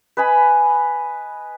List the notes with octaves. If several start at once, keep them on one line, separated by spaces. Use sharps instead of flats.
B4 D#5 G#5 B5